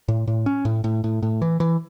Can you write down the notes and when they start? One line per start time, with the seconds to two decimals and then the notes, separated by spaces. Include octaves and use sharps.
0.08 A2
0.27 A2
0.46 C#4
0.65 A2
0.84 A2
1.04 A2
1.22 A2
1.42 E3
1.60 E3